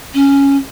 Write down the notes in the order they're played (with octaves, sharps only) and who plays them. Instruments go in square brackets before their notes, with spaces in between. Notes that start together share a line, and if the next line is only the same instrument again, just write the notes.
[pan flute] C#4